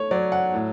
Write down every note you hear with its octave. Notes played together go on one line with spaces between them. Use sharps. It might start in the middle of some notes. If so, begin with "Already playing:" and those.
Already playing: A3 C#5
F#3 D5
F#5
A2